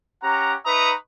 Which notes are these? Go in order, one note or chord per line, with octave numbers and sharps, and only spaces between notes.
C#4 G4 F#5 A#5
D#4 B4 E5 A#5 C#6 D#6